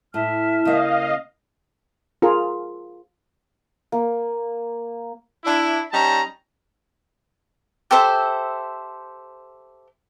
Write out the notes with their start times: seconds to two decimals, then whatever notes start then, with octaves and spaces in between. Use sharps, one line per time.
0.14 A2 E5 A5 F6
0.65 C#3 A#3 D#5 F5
2.22 F4 G#4 A#4
3.92 A#3
5.45 D4 E4
5.91 G3 C#4 D#4 A5 A#5
7.91 G4 A4 C5 E5